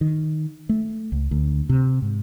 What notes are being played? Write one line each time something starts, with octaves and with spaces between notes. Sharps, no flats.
D#3
A3
C#2
D2
C3
G#2